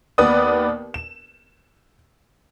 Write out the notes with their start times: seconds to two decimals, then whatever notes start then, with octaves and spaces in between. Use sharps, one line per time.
0.18 D#2 B3 B4 D5 D#6
0.94 E7